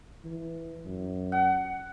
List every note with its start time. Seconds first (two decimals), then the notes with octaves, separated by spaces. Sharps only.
0.25 E3
0.86 F#2
1.32 F#5